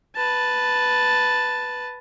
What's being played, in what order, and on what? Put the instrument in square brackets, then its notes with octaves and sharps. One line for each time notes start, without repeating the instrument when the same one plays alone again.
[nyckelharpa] B4 A5